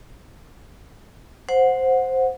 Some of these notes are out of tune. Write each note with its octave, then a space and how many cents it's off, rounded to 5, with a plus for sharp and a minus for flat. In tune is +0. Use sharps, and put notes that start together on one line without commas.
C5 +0 F#5 -15